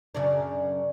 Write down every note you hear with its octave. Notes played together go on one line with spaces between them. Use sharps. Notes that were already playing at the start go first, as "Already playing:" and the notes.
F#2 C#3 D4